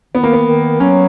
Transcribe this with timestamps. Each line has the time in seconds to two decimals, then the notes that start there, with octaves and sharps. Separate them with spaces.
0.14 D#3 B3
0.24 A#3
0.33 B3
0.46 D#3
0.80 F#3 C#4